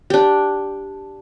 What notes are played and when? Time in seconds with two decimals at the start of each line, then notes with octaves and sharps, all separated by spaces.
0.10 D4 G4